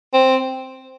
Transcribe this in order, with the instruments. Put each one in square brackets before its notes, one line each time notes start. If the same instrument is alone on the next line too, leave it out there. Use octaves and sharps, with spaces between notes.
[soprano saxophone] C4